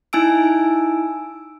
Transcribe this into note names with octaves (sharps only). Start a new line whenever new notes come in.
D#4 E4 G#5 E6 D7